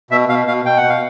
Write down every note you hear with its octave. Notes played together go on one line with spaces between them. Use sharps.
B2 E5
B2 F5
B2 F5
B2 G5
F#5
B2
F5